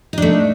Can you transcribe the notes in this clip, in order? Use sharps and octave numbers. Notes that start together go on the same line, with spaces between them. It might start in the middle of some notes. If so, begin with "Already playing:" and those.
A3 D4 D#4